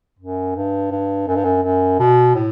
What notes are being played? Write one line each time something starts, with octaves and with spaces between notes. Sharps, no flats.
F#2
G2
G2
F#2
G2
F#2
F#2
B2
A2